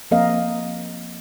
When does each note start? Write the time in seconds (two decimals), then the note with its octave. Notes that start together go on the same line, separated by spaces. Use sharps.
0.11 F3 A#3 C4 A#4 D#5 F5